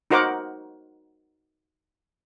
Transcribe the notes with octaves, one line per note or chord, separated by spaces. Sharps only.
D#4 F#4 A#4 C5 F#5 D6